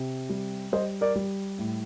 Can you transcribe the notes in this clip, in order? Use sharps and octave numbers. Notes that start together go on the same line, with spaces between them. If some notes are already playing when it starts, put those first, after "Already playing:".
Already playing: C3
G3
G3 C5 D#5
A#4 D5
G3
A2